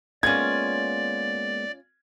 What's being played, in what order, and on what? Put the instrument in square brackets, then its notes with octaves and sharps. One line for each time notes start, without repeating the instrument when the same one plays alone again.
[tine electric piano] G#3 A#3 B3 [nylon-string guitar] C#4 F4 [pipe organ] D5 [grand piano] G#6